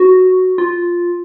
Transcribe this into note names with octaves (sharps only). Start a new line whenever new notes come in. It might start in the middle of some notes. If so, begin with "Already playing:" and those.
Already playing: F#4
F4